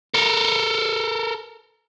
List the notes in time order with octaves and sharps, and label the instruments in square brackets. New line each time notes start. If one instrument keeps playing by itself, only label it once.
[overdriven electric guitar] A4 A#4